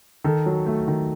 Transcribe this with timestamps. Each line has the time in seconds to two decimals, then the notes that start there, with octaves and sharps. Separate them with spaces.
0.24 D#3 A4
0.46 F#3
0.67 A3
0.88 D#3